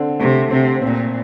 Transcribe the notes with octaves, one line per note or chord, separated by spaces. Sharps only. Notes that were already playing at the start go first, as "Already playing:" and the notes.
Already playing: D3 C4
C3 A3
C3 C4
A#2 C4